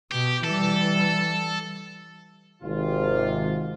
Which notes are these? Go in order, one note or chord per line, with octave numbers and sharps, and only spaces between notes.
B2 G4
E3 G3 A4
G#1 C3 F4